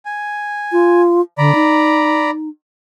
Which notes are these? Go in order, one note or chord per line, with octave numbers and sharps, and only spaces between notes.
G#5
F4
D3 D5 A#5 B5
D#4